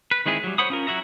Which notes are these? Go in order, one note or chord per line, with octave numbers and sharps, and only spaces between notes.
B4
D#3 G#3 C4 E4 G#4
F#3 G3
C5 C#5 F#5 B5 D#6
C#4 F4 A#4
F#3 E4 F#4 E5 A#5